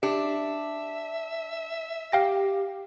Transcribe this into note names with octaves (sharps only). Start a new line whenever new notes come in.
D4 G4 E5
G4 F5 G5 A#6